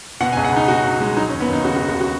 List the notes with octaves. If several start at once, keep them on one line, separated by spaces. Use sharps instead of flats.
B2 F#5
G#5
C#2
F#5
C#2 D#4
B2 F#4
C#2
G#3
F#3 D#4
C#4
D#2
B3
D#2 D#4
C#3 F#4
F#4
D#2
F#4
F#4